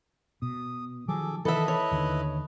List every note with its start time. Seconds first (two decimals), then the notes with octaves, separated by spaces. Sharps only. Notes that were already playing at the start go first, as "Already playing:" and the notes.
0.42 B2 D#6
1.08 D#3 F3 F#3 G#4 A4 D6
1.45 D#3 E3 E4 A4 B4 D#5 E5
1.68 C#5
1.91 D#2 D3 D#3